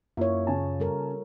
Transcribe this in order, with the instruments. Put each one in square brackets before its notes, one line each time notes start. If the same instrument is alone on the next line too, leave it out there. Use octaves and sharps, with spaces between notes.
[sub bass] F#2 [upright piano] A#3 E4 [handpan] F4 C#5
[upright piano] C#3 G#5 A5
[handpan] G3 A4 A#4